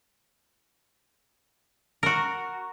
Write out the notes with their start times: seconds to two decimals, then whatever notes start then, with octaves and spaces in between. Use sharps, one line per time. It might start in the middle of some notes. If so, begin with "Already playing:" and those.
2.03 F#4 A#4